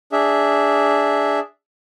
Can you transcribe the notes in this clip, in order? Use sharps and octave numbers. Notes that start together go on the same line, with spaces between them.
D4 G#4 E5